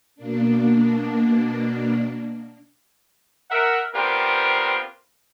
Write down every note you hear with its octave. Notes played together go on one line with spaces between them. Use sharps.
B2 A#3 D4
A#4 E5 F#5
B3 C4 D4 F4 G4 A#4